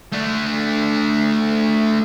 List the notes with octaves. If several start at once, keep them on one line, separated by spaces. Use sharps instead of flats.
A3 D4